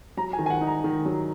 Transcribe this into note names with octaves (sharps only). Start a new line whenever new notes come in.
F#3 A#5
G#5
D#3
G#5
F#5
D#4
A#5
D#3
F#3